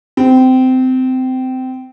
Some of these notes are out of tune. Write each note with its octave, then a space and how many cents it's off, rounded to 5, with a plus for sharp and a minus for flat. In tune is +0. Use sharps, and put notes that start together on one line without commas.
C4 -20